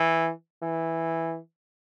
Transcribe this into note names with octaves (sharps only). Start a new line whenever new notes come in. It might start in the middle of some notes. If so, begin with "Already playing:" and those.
Already playing: E3
E3